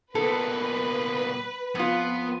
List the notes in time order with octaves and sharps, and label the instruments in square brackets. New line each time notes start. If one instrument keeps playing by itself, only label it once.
[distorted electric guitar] A#2 B3 [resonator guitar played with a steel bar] A4 [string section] B4
[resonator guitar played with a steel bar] F2 F4 [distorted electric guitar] B3